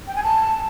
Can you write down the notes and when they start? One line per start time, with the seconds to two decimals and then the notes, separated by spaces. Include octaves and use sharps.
0.07 G5
0.15 G#5
0.24 A5